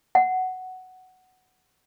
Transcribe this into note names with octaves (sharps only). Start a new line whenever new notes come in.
F#5